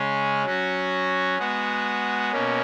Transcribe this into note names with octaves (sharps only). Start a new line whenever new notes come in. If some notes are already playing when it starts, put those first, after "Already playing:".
Already playing: C#3 G#3 C#4
F#3 C#4 F#4
G#3 B3 F#4
B2 A#3 C#4